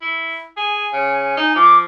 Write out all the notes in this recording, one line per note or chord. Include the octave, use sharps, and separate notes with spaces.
E4
G#4 G#5
C#3
D#4
F3 D6